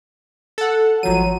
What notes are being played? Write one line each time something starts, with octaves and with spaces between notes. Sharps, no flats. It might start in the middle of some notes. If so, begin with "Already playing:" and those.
A4 F#5
G#1 F3 F#3 D#7